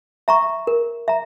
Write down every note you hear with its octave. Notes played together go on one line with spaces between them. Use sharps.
E5 A#5 C#6
A#4
E5 A#5